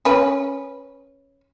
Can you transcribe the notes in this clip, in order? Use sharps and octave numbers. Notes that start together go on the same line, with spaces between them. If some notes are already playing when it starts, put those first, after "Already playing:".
C#4 B4